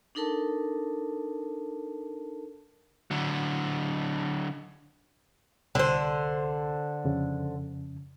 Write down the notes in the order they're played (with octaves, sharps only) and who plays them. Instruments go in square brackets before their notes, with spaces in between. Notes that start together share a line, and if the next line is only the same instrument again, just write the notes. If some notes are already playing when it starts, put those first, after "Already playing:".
[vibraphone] D4 D#4 A4 A#4 A5
[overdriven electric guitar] D3 F#3
[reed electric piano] C2 [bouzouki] D3 C5
[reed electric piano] F2 C#3